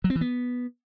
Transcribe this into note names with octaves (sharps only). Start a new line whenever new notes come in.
F#3
C4
E3
B3